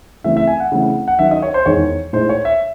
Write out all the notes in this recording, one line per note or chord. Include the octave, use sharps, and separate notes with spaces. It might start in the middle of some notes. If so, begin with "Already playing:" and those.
C#3 E3 A3 C4 E5
E5
G#5
F#5
C#3 E3 A3 C4 E4
F#5
D#3 F#3 C#4 E5
D#5
C#5
C5
E2 D#3 G#3 D#4 C#5
A2 G#3 D#4 C5
C#5
E5